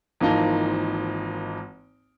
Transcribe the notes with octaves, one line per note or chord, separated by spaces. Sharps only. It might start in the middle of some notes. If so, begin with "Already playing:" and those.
G#1 E3 F3 A#3 D#4 A5